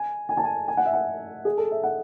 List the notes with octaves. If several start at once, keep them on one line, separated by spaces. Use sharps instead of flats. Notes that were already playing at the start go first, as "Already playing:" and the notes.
Already playing: G#5
G#5
A5
G#5
G#5
F#5
E5
F#5
G#4
A4
E5
F#5